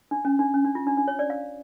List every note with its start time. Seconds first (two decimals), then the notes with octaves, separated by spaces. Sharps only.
0.11 D4
0.25 C#4
0.39 D4
0.54 C#4
0.65 D4
0.75 F4
0.87 D4
0.97 D4
1.08 C#5
1.19 D5
1.30 F5